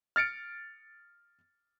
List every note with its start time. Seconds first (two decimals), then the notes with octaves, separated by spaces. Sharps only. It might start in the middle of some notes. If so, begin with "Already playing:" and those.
0.16 F6 A6 C#7 D7